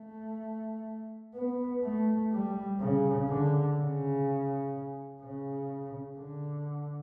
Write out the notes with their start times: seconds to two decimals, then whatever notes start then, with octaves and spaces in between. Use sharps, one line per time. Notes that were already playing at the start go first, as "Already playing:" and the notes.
Already playing: A3
1.35 B3
1.83 A3
2.32 G3
2.80 C#3
3.28 D3
3.77 C#3
5.21 C#3
6.18 D3